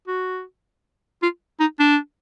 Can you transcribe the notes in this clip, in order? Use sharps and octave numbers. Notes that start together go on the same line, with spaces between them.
F#4
F4
D#4
D4